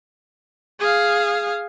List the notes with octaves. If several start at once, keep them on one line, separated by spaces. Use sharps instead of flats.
G#4 F5